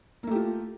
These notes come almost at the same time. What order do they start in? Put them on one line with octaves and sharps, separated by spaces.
A#3 A3 G4 F4